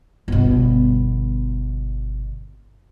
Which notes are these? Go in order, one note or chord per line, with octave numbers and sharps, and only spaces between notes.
G1 B2